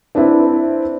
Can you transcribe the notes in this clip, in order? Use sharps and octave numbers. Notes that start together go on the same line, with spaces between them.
C4 D4 E4 B4 E5